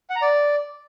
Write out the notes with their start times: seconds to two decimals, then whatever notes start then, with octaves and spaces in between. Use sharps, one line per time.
0.10 F#5
0.16 A#5
0.22 D5